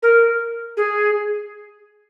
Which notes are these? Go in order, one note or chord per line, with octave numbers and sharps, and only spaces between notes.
A#4
G#4